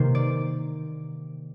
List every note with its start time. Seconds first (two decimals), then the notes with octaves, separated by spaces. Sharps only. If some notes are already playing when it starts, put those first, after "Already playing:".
Already playing: C3 D#3 A#3 C5
0.15 D5